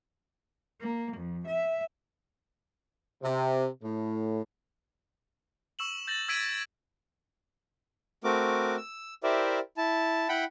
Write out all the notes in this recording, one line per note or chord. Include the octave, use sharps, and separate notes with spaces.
A#3
F2
E5
C3
A2
C#6 E6 E7 F#7
G6 A6 A#6 F#7
E6 G#6 B6 D7 D#7
A3 C4 F#4 A#4 D6
E6
E4 G4 A#4 C5 D5 E5
E4 A5
E4 F#5 G5 B5